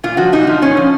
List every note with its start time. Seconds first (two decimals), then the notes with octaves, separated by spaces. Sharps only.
0.04 A#2 F4
0.17 F3 F#4
0.32 A#2 D#4
0.47 F3
0.62 A#2 C#4
0.77 F3